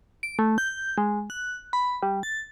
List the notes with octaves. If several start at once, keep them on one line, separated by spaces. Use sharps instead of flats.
D7
A3
G6
G#3
F#6
B5
G3
A6